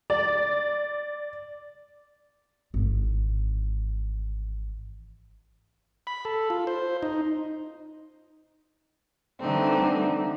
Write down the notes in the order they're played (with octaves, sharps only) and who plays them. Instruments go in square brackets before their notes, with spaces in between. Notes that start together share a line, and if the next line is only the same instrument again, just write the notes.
[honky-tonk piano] D5
[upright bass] G#1 E3
[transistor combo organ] B5
A4
F4
C5
D#4
[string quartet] D3 E3 G3 A3 C4 D#4